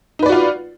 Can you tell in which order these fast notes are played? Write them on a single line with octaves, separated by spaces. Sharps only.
D#4 B4 D5 F#4 F4